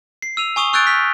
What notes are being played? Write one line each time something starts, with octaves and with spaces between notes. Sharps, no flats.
C7
E6 D#7 F7
G#5 C#6 D#6 F7 G7
C#6 E6 F#6 G6 A6 D7
F6 B6